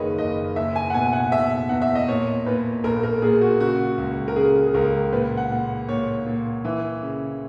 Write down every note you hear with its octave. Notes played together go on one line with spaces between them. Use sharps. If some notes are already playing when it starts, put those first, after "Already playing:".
Already playing: F#1 D#3 G#4 A#4 B4 C#5 D#5
F#1 D#5
F#1 E5
G#5
F#5
B2 G#5
F#5
B2 E5
E2 F#5
E5
D#5
A#2 C#5
A#2 B4
A#1 A#4
A#4
A#2 G#4
F#4
C#3 F#4
C#2
A#4
C#3 G#4
G#4
C#2 A#4
A#2 B4
F#5
A#2
A#2 C#5
A#2
E3
C#3